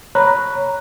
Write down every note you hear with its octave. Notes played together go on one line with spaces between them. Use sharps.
C#5 A#5 B5 F#6